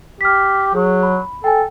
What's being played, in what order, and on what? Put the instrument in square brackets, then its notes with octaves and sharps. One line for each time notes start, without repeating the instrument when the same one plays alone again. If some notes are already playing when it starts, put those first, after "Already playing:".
[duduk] G4 [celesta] F6 B6
[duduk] F#3 [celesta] G#4
[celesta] B5
[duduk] A4 [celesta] G5 G#5